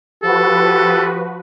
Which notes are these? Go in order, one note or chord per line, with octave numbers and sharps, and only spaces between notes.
F3 F#4 G4 A4 B4